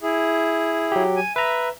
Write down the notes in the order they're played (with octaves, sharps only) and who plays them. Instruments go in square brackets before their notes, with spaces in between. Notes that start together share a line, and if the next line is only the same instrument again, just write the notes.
[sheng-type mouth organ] E4 G#4
[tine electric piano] F#3 G4
[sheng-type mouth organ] G#5
[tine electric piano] B4 A#5 [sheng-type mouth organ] E5